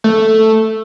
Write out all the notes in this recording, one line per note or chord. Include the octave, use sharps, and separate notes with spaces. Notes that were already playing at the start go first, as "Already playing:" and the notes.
A3